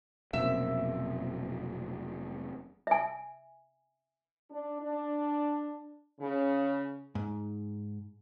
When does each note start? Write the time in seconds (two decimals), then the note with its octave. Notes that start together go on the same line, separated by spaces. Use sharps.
0.33 F1 B2 F#3 A#3 C4 C#4 E5
2.87 E5 G#5
4.51 D4
4.82 D4
6.20 C#3
7.15 G#2